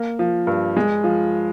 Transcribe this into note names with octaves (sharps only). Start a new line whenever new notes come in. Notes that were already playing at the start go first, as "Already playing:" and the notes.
Already playing: A#3
F3
G2
G#3
F3